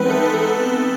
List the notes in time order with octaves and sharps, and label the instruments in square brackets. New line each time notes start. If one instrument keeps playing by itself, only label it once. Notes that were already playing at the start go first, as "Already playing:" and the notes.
Already playing: [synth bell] E3 G#3 B3 C4 D#4 B4
A4
A4